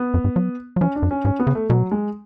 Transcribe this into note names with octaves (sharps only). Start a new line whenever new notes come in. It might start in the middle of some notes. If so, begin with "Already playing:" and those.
Already playing: B3
F#2
G#2
F#3
F#3
F3 C#4
D4
F#2
C#4
G#2 C#4
B3
C#3
A3
B2 F#3
G#3